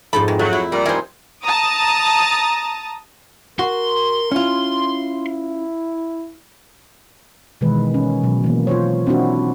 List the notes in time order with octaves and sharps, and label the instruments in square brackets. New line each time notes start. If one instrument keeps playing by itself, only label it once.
[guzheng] F2 G#2 A4 [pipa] B5
[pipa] D#3 E3 G#3
[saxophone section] F#3 [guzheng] A3
[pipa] E4
[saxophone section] A#2 G3 [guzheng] A#4
[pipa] D#3 E4 G#4 [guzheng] A#4 C5
[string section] A5 A#5 D#6
[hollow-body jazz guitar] F#4 [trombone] A#4 [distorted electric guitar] C6
[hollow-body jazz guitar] C#4 F4 [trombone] E4
[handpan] B2 D#3 E3 G#3 B4
C#4
B2 F#3
E3 A#3
F4 C5 C#5
C4 D4 E4 F#4